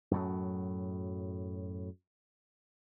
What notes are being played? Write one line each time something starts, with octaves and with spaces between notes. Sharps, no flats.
F#2 A2 F#3